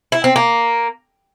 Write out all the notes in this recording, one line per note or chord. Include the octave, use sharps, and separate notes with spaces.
E4
C4
A#3